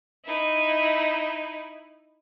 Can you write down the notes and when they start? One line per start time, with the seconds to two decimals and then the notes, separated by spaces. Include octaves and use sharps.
0.25 D#4 E4